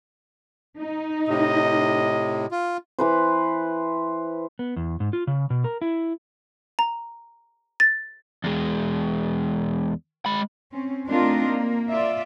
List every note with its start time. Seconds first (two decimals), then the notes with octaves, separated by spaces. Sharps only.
0.78 D#4
1.29 A2 C3 D#5
2.51 F4
2.99 E3 B4 C5
4.59 B3
4.76 E2
5.00 G#2
5.13 F4
5.27 C#3
5.50 B2
5.64 A#4
5.82 E4
6.79 A#5
7.80 A6
8.44 E2 G#3
10.26 G#3 B5
10.71 C4 C#4
11.07 A3 C4 D4 D#4 F4 A#4
11.47 A#3
11.89 F4 D5 E5